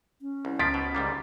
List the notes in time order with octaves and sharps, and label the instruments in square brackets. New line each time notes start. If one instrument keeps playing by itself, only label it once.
[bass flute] C#4
[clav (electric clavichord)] C2
[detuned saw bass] C#2 [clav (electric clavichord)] D#3 F3 F4 [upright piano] A6 B6 D7
[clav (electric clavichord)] B2
G#2 G3 A#3